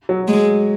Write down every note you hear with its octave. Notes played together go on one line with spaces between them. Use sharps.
F#3
G#3